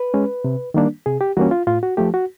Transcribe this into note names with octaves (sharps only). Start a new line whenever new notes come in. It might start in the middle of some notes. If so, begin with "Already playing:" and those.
Already playing: B4
G#3 C#4
C3
D#3 G3 A#3 D4
C3 G#4
G4
E3 G3 A#3 C#4 F#4
F4
A2 F4
F#4
F3 A3 G4
F#4